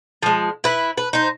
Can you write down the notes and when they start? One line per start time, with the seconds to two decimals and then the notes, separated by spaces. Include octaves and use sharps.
0.23 F3 G#3
0.64 E4 B4
0.98 B4
1.13 D#4 C5